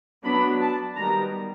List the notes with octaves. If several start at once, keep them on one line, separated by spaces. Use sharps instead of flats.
F#3 B3 D4 B5
A5
D#3 G3 B3 A#5